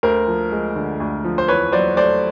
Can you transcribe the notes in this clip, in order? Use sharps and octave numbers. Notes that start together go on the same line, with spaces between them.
D2 A#4 C5
F3
G#3
D3
D2
F3
C5
E2 B4 C#5
F#3 C5 D5
A3 C5 D5